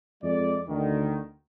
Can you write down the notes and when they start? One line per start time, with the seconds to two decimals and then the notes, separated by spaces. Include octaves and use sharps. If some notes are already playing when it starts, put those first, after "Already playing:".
0.23 F2 G#3 D5
0.69 D2 D3 D#3